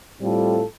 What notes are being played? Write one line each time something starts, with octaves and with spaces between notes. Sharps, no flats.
A2 G3 C4 F4 A4